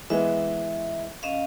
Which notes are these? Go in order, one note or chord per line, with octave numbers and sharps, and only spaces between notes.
E3 G#3 B3 E5
C#4 D#5 F5